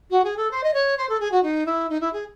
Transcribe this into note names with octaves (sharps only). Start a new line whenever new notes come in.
F#4
G#4
A4
C5
D#5
C#5
C5
A4
G#4
F#4
D#4
E4
D#4
E4
G#4